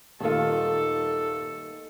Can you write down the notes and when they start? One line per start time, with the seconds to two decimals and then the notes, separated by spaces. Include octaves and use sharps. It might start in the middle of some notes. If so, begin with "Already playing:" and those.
0.20 D#1 D#3 G3 A3 F4 A4